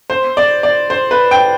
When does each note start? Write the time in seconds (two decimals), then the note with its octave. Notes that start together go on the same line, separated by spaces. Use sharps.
0.10 C5
0.37 D5
0.63 D5
0.90 C5
1.11 B4
1.31 G5